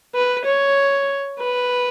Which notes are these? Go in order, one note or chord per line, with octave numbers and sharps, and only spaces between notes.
B4
C#5
B4